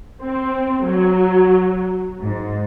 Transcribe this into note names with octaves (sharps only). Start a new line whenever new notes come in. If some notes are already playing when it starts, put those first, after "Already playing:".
C4
F#3
G#2